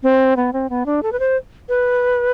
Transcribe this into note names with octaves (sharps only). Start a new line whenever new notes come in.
C4
B3
C4
B3
D4
A4
B4
C5
B4